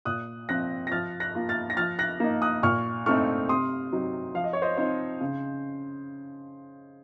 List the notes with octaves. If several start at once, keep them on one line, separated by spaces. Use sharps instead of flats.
A#2 D#6 F#6
F3 C4 F#6 A#6
A#6
F3 F6 A6
F#6 A#6
A#3 F4
F6 A6
A#6
F3 F6 A6
F#6 A#6
A#3 D#4
D#6 F#6
A#2 C#6 F6
A3 C4 D#4 C#6 F6
C3 C6 D#6
F#3 C4 D#4
F3 F5
D#5
C#5
C5 D#5
C4 D#4 C5
C#3